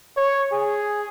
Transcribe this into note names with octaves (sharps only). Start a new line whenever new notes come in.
C#5
G#4